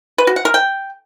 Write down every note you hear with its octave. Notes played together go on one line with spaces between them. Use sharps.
B4
F#4
F#5
A#4
G5